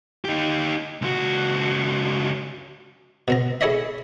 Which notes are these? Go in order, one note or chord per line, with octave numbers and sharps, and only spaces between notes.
D#4 G4
C#2 F#4
B2 C4 A#5
E4 G#4 A4 C#5 D#5 E5